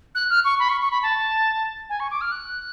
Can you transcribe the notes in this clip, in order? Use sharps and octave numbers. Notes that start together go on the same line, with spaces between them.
F#6
F6
C#6
B5
C#6
C#6
B5
A5
G#5
C#6
D6
F6
F#6